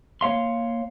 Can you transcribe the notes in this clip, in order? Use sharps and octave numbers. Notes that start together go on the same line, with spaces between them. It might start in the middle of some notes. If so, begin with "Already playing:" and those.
A#3 C#5 F5 C6